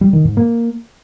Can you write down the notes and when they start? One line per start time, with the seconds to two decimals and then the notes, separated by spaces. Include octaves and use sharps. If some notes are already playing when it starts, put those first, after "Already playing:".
0.01 G3
0.13 D#3
0.25 G#2
0.37 A#3